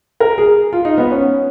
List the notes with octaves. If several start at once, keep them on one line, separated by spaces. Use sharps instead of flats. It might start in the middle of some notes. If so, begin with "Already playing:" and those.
A#4
G#4
F4
D#4
B3
C#4